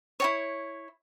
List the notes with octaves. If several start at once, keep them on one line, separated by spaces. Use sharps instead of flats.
E4 F#4 C#5